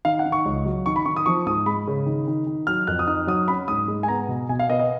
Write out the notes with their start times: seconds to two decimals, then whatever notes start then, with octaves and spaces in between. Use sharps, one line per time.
0.05 D#3 F5
0.19 F#5
0.26 D#3
0.32 C#6
0.45 C#2
0.66 F#3
0.86 D#3 C#6
0.96 B5
1.06 D#3 C#6
1.16 D#6
1.26 F3 C#6
1.46 G#2 D#6
1.66 G#3 B5
1.87 C#3
2.06 D#3
2.28 D#3
2.47 D#3
2.67 F#3 F6
2.87 F2 F#6
2.99 D#6
3.07 D#4 F6
3.27 F#3 D#6
3.48 C#4 B5
3.68 G#2 D#6
3.88 G#3
4.03 G#5
4.08 B3 A#5
4.28 B2
4.49 B2 G#5
4.59 F5
4.69 B3 D#5
4.79 D#5